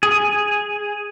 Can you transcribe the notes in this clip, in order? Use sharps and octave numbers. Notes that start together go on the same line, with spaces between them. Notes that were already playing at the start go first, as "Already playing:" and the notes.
G#4